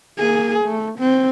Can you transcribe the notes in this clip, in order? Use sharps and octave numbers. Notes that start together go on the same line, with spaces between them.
A#3 G#4
A3
C4